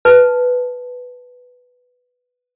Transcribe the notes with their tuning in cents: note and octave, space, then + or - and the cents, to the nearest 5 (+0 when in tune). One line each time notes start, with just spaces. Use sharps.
B4 +0 A5 +0